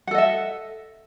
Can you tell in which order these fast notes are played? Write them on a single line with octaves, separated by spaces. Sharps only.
F#5 A4 D#5 E5